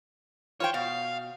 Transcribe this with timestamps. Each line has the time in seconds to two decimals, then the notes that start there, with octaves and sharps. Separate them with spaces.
0.60 F4 C5 C#5 G5
0.74 B2 F5